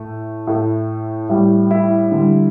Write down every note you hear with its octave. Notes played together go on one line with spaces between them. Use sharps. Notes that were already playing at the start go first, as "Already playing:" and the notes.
Already playing: A2 A3
A2 A3
A2 G3
E4
D3 G3